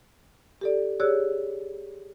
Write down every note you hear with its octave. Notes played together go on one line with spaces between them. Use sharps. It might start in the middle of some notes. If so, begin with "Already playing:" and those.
G4 A4 D5
G4 G#4 C#5 D5 E6 F#6